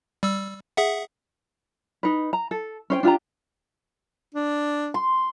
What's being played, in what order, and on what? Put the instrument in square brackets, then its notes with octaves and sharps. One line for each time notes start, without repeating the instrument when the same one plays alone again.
[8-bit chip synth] G3 E6
G#4 E5 F#5
[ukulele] D#4 B4
A#5
A4
C#4 C5 G5
D4 F4 G4 A#5
[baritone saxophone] D4
[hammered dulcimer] C6